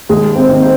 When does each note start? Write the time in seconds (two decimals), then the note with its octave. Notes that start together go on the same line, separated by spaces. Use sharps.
0.09 D#2 G#3 G#4
0.36 C4 C5
0.49 D#3 A#3
0.62 C5